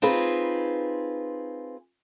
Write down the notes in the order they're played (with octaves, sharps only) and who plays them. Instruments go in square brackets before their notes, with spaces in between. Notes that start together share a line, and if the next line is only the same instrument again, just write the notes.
[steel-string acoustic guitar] C4 D#4 F4 G#4 B4